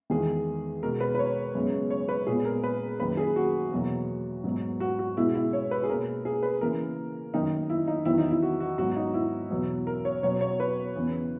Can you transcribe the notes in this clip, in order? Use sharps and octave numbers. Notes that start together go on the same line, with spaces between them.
E2 D#3 G#3 B3 G#4
B2 G#3 B3 A#4
B4
B4
C#5
F#2 C#3 G#3 B3
C#5
B4
A#2 G#3 B3 G#4
A#4
B4
F#2 D#3 A#3 B4
G#4
F#4
E2 B2 F#3 A#3
G#2 F#3 B3
F#4
F#4
B2 G#3 B3 E4
E4
C#5
B4
G#4
B2 A#3 A#4
G#4
B4
C#3 E3 A#3 A#4
F#2 D#3 A#3 D#4
E4
D#4
E2 D#3 F#3 B3 E4
D#4
E4
F#4
F#4
G#2 F#3 B3 F#4
D#4
E4
E2 B2 F#3 B3
A#4
C#5
B2 F#3 B3 C#5
C#5
B4
E2 C#3 E3 B3